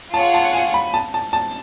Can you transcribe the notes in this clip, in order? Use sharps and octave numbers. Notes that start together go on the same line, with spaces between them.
F4 G#4 C#5 F#5 A5
A5
G#5
B5
A5
A5
A5